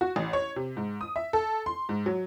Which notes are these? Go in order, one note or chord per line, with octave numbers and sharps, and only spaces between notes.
F#4
A1
C#5
C3
G#2
D#6
E5
A4
C6
G#2
F#3